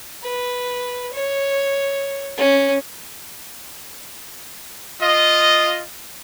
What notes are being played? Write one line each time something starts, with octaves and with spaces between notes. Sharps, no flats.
B4
C#5
C#4
F4 D#5